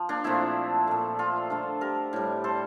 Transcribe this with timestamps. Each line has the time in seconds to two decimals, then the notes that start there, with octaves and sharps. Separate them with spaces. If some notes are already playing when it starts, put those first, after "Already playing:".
Already playing: F3
0.09 A#3 D4
0.24 A#2 F3 A3 C4 E4
0.87 A#2 A3
1.19 F4 A4
1.50 D3 A3
1.81 G4 A#4
2.13 A2 G3
2.44 A4 C5